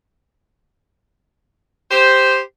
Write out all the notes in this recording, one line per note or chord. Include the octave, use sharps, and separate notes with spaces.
G4 C5